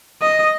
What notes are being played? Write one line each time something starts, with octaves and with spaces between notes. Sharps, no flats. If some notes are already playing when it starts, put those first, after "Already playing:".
D#5